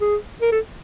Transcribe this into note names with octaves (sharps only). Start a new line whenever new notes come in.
G#4
A#4
A4